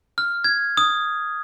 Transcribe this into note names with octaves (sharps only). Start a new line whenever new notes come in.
F6
G#6
D#6